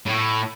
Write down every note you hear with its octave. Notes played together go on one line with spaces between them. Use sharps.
A2